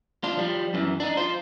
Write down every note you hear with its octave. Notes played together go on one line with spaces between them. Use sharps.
D4 F4
F3 G3
F#2 E3
D4 D#4
F4 C5